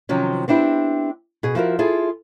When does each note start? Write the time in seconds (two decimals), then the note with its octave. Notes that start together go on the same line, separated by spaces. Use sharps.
0.09 C3 D#3 F3 F#3 C#4
0.48 B3 C4 D4 E4 G4
1.43 B2 G#4
1.55 F3 E4 F#4 A#4
1.79 E4 F4 G#4 A4